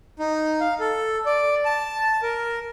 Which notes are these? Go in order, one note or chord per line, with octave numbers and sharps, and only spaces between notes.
D#4
F5
A4
D5
A5
A#4